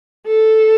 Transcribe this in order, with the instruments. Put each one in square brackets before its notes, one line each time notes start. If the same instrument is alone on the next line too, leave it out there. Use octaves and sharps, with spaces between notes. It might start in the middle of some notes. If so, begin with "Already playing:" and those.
[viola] A4